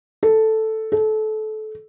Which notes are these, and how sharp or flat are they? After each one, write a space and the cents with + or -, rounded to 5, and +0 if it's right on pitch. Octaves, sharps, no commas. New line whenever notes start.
A4 +0
A4 -25